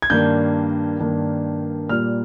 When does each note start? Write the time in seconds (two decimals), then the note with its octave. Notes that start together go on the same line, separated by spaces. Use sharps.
0.02 G#6
0.10 G2 D#3 A#3 D4 G6
0.99 G2 D#3 A#3 D4
1.89 A#2 G3 A#3 F6